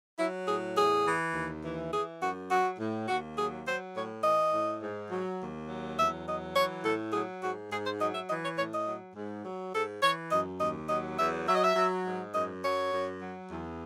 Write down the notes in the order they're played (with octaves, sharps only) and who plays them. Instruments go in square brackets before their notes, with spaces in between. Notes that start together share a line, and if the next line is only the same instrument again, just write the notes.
[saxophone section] F#3 E4
A2 G#4
E2 G#4
E3
D#2
E3
E3 G#4
F#2 F#4
F#3 F#4
A2
D#2 F#4
F#3 G#4
F#3 C5
A2 C#5
E3 D#5
A2
G#2
F#3
D#2
F#3
E2 E5
F#3 D#5
E3 C#5
A2 A4
F#3 G#4
G#2 F#4
G#2 G#4
C5
F#3 D#5
E5
E3 D#5
C#5
A2 C#5
D#5
F#3
G#2
F#3
G#2 A4
E3 C#5
F#2 D#5
D#2 D#5
F#3 D#5
E2 E5
F#3 E5
D#5
E5
F#3
G#2
F#2 D#5
F#3 C#5
F#2
F#3
E2